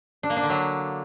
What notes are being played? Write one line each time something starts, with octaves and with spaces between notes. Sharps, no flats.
D4
A#3
D4
D3
F#3